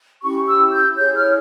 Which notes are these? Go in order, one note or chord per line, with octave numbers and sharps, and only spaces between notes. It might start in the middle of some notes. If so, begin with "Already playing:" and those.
C#4 E4 G4 C#6
E6
G6
E4 G#4 C#5 G6
F6